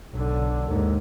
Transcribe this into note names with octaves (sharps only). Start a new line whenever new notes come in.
B1 D3
D#2 G#2